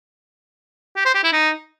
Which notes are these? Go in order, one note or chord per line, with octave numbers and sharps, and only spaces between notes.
G4
C5
G4
E4
D#4